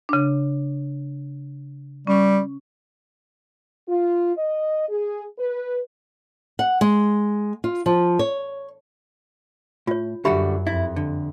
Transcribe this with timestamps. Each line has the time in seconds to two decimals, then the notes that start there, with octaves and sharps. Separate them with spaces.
0.09 C#3 D4
2.07 G3 C#4 C#6
3.87 F4
4.37 D#5
4.89 G#4
5.38 B4
6.59 F#5
6.81 G#3
7.64 F4
7.86 F3
8.19 C#5
9.87 A2 F4 C#5
10.25 F#2 D3 G3 F#4 G4 E5 B5
10.67 F2 E4 E5
10.96 D3